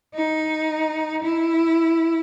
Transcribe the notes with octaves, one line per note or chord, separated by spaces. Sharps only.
D#4
E4